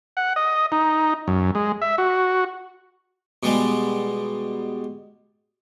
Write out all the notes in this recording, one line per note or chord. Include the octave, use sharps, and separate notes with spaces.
F#5
D#5
D#4
F#2
G#3
E5
F#4
B2 G3 G#3